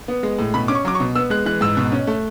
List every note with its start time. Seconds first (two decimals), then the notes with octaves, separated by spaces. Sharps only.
0.08 B3
0.23 G#3
0.39 A2
0.54 B2 B5
0.68 C#4 D6
0.75 C#6
0.85 F#3 D6
0.95 C#6
1.00 B2
1.15 B3 E6
1.30 G#3 F#6
1.46 E3 F#6
1.61 G#2 E6
1.77 B2
1.92 C#4
2.07 A3